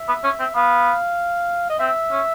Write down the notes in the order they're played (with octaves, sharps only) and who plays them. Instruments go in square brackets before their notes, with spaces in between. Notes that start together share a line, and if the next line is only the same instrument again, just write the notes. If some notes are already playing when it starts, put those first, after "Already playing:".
Already playing: [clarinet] E5
[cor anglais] B3
C#4
C4
[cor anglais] B3 [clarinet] F5
[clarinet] D#5
[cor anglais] C4 [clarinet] E5
[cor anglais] C#4